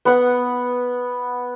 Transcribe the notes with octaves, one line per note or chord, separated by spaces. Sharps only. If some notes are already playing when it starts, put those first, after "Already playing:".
B3 F#5